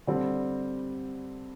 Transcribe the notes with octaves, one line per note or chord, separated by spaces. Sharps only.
D3 G3 C4